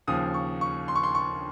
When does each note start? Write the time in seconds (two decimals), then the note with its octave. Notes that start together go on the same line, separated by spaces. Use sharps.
0.07 D#2 C#3 F3 D#6
0.34 C#6
0.61 C#6
0.88 C6
0.96 C#6
1.03 C6
1.15 C#6